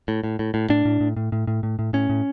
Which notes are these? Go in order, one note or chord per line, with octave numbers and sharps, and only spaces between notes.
A2
A2
A2
A2
A2 D4
A2
A2
A2
A2
A2
A2
A2
A2 C#4
A2